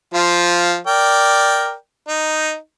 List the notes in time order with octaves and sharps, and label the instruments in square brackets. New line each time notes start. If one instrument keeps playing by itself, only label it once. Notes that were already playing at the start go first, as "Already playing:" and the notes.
[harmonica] F3 F4
A#4 D5 G5
D#4